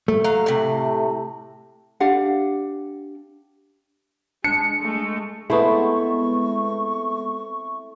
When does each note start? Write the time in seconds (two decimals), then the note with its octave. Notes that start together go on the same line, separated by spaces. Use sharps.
0.08 A3
0.24 F#3 F5
0.46 A2 C3
2.00 D4 G4 F5 F#5
4.44 G#3 D4 C#7
4.81 G#3 A3
5.50 G#3 A3 B3 C4 E4 A4 C5 C#6